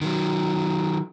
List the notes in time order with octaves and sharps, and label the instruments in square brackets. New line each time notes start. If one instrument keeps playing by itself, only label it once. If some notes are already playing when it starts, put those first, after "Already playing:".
[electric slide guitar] D#3 F#3